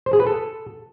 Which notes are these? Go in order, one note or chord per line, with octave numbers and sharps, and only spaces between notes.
C5
G#4
B4
A4